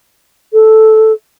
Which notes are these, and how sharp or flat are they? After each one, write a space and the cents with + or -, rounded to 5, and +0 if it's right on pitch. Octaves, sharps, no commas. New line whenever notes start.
A4 -5